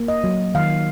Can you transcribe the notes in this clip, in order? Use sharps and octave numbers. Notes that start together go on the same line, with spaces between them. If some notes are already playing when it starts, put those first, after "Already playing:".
Already playing: A#3
D#5
F#3
D#3 F5